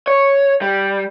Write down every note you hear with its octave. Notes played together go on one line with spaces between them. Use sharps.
C#5
G3